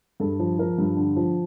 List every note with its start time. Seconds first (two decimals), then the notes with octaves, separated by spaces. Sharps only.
0.20 G2 A4
0.39 F3
0.59 F3 A#4
0.78 G2
0.97 D3
1.16 F3